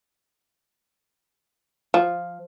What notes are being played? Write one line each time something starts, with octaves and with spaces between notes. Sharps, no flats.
F3